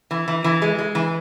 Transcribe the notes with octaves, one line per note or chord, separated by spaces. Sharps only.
E3
E3
E3
G#3
G#3
E3